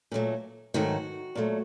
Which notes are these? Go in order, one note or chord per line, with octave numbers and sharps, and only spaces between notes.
A#2 F#3 A3
G#2 D#3 F#3 A3 F#4
A#2 F#3 A3